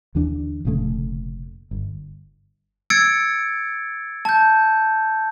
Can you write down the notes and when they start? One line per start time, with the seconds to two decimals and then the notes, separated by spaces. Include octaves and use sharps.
0.15 D#2 D3 E3 D4
0.65 F1 A#2 C#3 A3
1.71 G1
2.90 E6 G#6 A6 C#7 D7
4.25 A5 G6